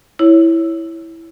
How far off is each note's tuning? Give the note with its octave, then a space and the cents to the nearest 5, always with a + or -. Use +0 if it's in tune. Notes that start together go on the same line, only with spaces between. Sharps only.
E4 +0 C#5 +0